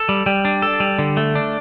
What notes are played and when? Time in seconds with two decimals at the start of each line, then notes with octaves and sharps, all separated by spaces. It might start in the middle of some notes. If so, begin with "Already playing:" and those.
Already playing: A4
0.09 G3
0.26 G3
0.45 D4
0.62 A4
0.80 G3
0.99 D3
1.17 A3
1.35 D4